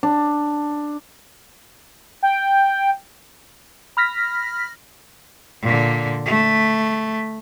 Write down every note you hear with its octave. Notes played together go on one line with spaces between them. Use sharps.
D4
G5
B5 F6 A#6 B6
A#2 D3
A3